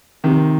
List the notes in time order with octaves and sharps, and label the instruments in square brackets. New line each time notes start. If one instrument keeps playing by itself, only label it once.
[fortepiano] C3 D#3